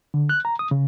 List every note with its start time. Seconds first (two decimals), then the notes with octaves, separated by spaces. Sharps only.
0.14 D3
0.29 F#6
0.45 A#5
0.59 D#6
0.71 C#3